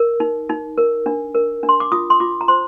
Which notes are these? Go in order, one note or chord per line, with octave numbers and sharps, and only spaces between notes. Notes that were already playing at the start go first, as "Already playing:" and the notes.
Already playing: A#4
D#4
D#4
A#4
D4
A#4
D4
C6
D6
F4 D#6
C6
F4 D6
A#5
C5 C6